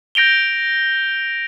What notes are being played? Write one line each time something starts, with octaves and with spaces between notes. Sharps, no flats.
G6 A#6 D7 F7 G7